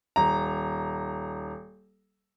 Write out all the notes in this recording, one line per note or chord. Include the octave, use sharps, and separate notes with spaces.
D#1 A#5